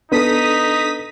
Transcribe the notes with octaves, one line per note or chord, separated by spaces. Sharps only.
B3 D4 D#4 A4 D#6 B6